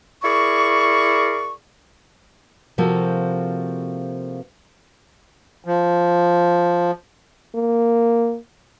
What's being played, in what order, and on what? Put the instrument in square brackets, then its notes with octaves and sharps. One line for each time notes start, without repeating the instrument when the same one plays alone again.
[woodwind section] E4 G#4 A#4 D5 C#6
[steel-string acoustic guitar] C3 F3 A#3 F#4 A4
[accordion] F3
[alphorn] A#3